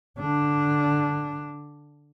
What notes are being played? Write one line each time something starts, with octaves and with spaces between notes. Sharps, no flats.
D3 D4